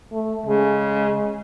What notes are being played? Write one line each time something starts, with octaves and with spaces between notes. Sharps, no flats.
A3
C#3 G#3